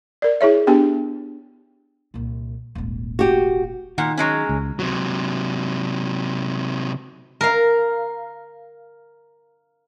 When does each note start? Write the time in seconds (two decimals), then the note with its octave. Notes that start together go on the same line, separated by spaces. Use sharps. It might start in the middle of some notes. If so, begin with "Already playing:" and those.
0.22 A#4 D5
0.41 E4 G#4 C#5 E5
0.67 B3 D4 G4 G5
2.14 C2 A#2
2.75 D#1 G#1
3.19 F#4 G4
3.98 A#2 D#3 F#5
4.17 F#3 G#3 C#4
4.49 C#2
4.79 C3 F#3
7.41 A#4 F5